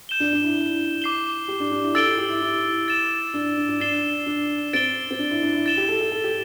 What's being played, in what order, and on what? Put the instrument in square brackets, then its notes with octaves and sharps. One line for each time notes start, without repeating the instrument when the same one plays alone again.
[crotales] G6 E7 G7
[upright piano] D4
D4
E4
[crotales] D6 C7 G7
[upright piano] G4
D4
D4
E4
[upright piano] A4 [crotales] E6 A6 D7 G7
[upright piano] G4
G4
E4
E4
[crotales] A6 E7 G7
[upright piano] D4
D4
D4
[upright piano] D4 [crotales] A6 C7 E7 G7
[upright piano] D4
[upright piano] C4 [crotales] A6 D7 G7
[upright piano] C4
D4
E4
D4
E4
[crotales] A6 E7 G7
[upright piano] G4
A4
G4
A4
G4